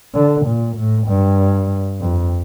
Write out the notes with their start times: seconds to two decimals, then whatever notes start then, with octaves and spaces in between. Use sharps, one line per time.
0.15 D3
0.46 A#2
0.76 A2
1.08 G2
2.00 F2